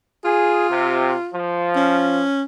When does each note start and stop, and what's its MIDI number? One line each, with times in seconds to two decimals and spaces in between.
0.24 1.32 65
0.24 0.67 68
0.70 1.13 48
1.34 2.23 53
1.76 2.43 61